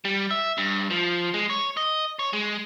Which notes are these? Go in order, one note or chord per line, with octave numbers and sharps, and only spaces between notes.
G3
E5
G2
F3
G#3
C#5
D#5
C#5
G#3